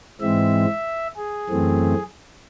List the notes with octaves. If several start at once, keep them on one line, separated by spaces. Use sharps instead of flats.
G#2 E3 G#3 C4 E5
G#4
F#2 E3 A3 C4